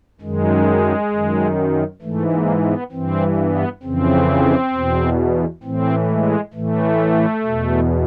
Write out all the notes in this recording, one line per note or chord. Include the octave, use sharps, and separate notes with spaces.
F#2 D#3 G#3
F#2 D#3
G#2 E3 A3
A#3
B3
G2 E3 C4
B3
F2 C#3 E3 C4
E2 B2
A2 E3 C4
G#3
A2 E3 A3
E2 B2